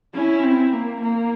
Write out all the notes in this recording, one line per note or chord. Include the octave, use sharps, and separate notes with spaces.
C#4 E4
C4
A#3
A#3